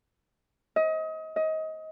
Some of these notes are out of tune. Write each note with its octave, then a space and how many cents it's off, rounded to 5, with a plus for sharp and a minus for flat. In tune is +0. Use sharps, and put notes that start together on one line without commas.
D#5 +30
D#5 +25